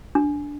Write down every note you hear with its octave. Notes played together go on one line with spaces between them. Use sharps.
D4